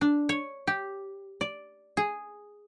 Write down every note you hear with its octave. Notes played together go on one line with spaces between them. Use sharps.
D4
C#5
G4
D5
G#4